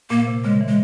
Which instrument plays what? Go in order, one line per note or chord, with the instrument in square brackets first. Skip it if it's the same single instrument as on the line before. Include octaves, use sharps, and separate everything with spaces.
[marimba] A#2 [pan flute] A#3
[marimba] C3
[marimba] C#3 [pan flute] G#3
[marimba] E3
[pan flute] G#3